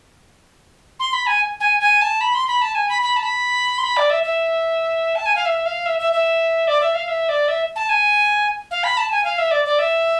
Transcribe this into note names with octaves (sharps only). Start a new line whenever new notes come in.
C6
B5
G#5
G#5
G#5
A5
B5
C6
B5
A5
G#5
B5
B5
A5
B5
C6
B5
D5
E5
E5
A5
G#5
F5
E5
F5
E5
E5
E5
D5
E5
F5
E5
D5
E5
A5
G#5
F5
B5
A5
G#5
F5
E5
D5
D5
E5